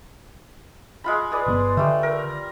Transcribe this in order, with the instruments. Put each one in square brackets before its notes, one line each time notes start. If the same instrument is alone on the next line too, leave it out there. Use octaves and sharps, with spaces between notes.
[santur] G#3 F4 B5
G#4 B4 D5
[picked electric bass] G1 B2 B3
[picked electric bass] D3 [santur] G3 A3
[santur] A#4